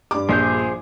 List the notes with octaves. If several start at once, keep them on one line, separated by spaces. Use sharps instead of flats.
G2 D6
A#1 F3 G#4 G6